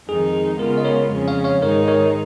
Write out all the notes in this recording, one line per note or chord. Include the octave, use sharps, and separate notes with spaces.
F2 D#3 G#3 D#4 G#4
G#4
C#3 G#3 B3 F4 A#4
D#5
A#4 C#5
F2 C#3 G#3 C#4
C#5 F5
C#5 F5
G#2 D#3 G#3 D#4 A#4 C#5
A#4 C#5